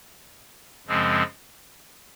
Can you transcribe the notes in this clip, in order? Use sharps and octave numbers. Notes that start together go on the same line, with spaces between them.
F#2 C#3 F3 G#3 C4